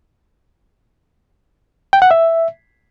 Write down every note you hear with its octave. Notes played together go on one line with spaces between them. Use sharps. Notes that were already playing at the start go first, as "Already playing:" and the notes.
G5
F#5
E5